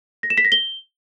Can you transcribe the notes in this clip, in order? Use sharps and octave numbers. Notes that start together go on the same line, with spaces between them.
A#6
E7
B6
A#6
G7